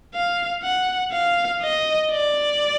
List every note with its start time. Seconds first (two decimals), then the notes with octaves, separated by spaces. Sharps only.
0.14 F5
0.63 F#5
1.13 F5
1.63 D#5
2.12 D5